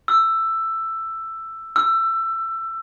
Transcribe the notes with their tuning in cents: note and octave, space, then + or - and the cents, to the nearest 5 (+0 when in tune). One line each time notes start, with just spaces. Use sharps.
E6 +10
E6 +20